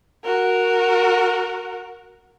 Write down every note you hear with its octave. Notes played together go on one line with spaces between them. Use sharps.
F#4 A#4